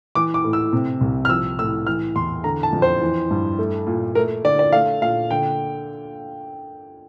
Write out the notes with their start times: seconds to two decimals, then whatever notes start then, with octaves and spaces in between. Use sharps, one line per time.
0.15 E3 D6
0.34 D6
0.44 A2
0.53 E6
0.73 C3
1.01 C2
1.25 F6
1.29 F3 E6
1.59 A2 E6
1.87 E3 F6
2.16 E2 C6
2.44 D3 A#5
2.63 A5
2.73 F2
2.82 C5
3.01 E3
3.31 G2
3.59 A3
3.87 A#2
4.15 A3 A#4
4.45 D3 D5
4.59 D5
4.72 A3 F5
5.01 A#2 F5
5.31 D3 G5